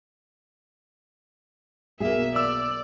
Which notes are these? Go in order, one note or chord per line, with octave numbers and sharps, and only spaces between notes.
B1 A#3 G#4 E5
D5 E6